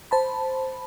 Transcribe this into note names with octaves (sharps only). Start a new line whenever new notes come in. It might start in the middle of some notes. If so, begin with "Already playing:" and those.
C5 A5 B5